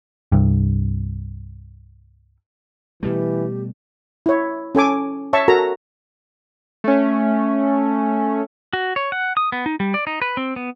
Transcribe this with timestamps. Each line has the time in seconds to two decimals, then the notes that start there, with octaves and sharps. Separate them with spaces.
0.32 C2 G2
3.03 B2 E3 G3 A3 G4
4.26 E4 C#5
4.75 C#4 A4 G#5 D6
5.33 C#5 E5 A5 C#6
5.48 F#4 A4 A#4 A#5
6.84 A3 C#4
8.73 F#4
8.96 C#5
9.12 F#5
9.37 D#6
9.52 B3
9.66 D#4
9.80 G3
9.94 D5
10.07 D#4
10.22 B4
10.37 C4
10.56 B3